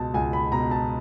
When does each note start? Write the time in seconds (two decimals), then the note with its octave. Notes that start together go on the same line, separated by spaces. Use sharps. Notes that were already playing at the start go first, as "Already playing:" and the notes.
Already playing: C#2 B2 A5
0.14 C#2 G#5
0.33 B5
0.52 B2 A#5
0.71 A5